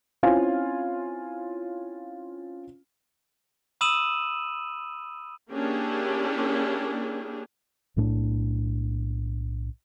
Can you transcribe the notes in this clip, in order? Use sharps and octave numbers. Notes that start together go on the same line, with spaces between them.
C4 C#4 E4 F4 F5 G#5
B5 D#6 E6 D#7 E7 F#7
A#3 C#4 D4 E4 G4 G#4
B1 A2 D4